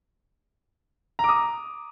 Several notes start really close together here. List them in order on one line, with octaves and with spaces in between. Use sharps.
A#5 D6 D#6